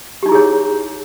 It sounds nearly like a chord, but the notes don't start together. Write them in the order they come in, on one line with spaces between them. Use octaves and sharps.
G4 D#4 E4 G#4 C#5